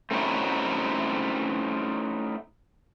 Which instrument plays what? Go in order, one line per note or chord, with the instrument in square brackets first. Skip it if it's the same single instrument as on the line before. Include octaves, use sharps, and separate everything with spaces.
[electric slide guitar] A3 C4 C#4 D#4 E4 F#4